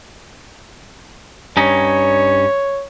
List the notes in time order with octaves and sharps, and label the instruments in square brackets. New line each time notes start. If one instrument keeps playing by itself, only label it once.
[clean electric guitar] G2 C#4 D#4 [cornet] C#5